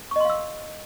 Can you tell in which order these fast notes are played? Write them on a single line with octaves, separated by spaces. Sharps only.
C#6 D#5 C6 F5 E6